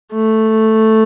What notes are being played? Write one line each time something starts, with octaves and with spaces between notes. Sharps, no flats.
A3